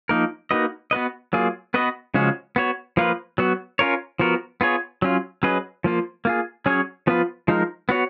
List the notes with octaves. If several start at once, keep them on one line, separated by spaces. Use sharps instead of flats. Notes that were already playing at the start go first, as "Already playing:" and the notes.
F3 A#3 D#4 A#4
A#3 D#4 F#4 B4 D#5
B3 F#4 B4 D#5
F#3 A#3 F4 G#4
B3 F#4 B4 D#5
C#3 F3 G#3 C#4 F#4
B3 F#4 C#5
F3 A#3 F4 B4
F#3 B3 F#4
C#4 F4 A#4 C#5
F3 B3 F#4 A#4
B3 F4 G#4 C#5
F#3 C#4 F4
F#3 C#4 G#4 B4 D#5
F3 A#3 F4
A#3 F4 G#4
F#3 C#4 G#4 C#5
F3 B3 F4 B4
F3 G#3 D#4 A#4
B3 F#4 C#5